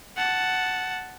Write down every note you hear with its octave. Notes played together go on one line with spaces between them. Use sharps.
F#5 A5